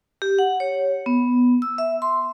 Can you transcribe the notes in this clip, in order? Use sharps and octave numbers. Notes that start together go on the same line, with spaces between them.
G4
F#5
C#5
B3
E6
E5
C6